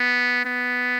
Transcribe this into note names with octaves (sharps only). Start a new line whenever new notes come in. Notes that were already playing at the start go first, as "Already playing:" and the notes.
Already playing: B3
B3